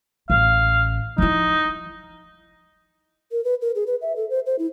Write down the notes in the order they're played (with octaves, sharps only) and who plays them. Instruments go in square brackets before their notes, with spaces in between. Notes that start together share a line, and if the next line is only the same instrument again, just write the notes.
[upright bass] A1 [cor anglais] F5
[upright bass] F3 E4 [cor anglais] D#4
[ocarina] A#4
B4
A#4
G#4
B4
E5
A4
C5
C5
E4